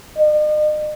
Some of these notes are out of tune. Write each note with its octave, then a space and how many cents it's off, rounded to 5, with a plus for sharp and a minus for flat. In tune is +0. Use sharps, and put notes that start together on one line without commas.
D#5 -45